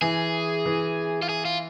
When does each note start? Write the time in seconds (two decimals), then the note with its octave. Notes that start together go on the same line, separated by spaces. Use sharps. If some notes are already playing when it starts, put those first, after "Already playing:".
0.01 E3 G#4
0.66 E3
1.22 F4
1.29 G#4
1.45 F4